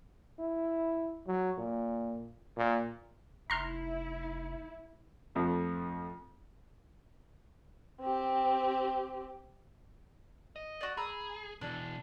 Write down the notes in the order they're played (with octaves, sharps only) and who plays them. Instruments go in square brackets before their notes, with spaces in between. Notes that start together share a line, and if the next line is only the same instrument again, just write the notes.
[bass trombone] E4
F#3
A#2
A#2
[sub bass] F1 [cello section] E4 [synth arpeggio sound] A#5 C6 F6
[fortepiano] F2 F3 A3
[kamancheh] C4 G4
[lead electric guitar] D#5
[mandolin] F#4 D5
[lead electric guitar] G#4 [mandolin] A#5 B5 E6
[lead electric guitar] B2 E3 [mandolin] D4